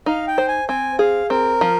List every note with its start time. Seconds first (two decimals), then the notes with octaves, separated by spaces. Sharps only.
0.06 D#4 F5
0.27 G5
0.38 C5
0.48 G#5
0.68 C4 G#5
0.99 G#4 F5
1.30 C4 A#4
1.61 F3